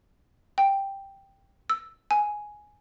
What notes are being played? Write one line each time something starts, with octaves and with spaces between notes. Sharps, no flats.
G5
E6
G#5